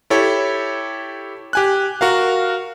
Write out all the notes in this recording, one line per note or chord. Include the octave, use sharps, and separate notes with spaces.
E4 G4 A4 C#5
G4 G#5 F#6
F#4 A#4 F5